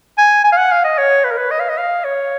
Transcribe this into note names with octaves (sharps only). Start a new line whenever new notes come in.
G#5
G#5
F5
F#5
F5
D#5
C#5
B4
A#4
B4
D#5
F5
D#5
F5
C#5